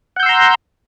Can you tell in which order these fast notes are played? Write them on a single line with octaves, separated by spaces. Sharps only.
F#5 G6 E6 C6 A#5